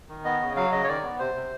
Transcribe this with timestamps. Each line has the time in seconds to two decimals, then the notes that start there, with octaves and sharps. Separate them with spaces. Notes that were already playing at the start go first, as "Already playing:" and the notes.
0.09 D#3
0.25 B3 D#5
0.41 C#3
0.56 F#3 F5
0.72 C#3 D#5
0.84 C#5
0.88 D#3 D5
1.03 B3
1.19 C3 C5
1.35 C3